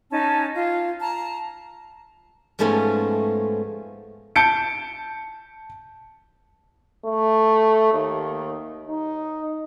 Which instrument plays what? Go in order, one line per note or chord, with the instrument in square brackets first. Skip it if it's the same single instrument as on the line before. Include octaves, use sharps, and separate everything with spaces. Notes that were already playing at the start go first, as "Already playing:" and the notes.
[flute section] C#4 D#4 A5
F4
A5 A#5
[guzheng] G#2 F3 G#3 A3 B3 C#4
[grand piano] A5 G6 C#7 D7
[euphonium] A3
D#2
D#4